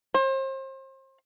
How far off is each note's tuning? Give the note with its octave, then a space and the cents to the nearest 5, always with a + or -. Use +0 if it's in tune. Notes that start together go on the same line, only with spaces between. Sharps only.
C5 +35